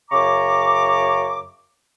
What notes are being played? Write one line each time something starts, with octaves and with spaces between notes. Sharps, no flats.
F#2 C#3 A#5 C#6 D6